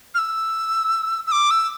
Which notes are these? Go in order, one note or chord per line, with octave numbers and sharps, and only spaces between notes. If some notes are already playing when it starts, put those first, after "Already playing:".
F6
E6
E6
D6
E6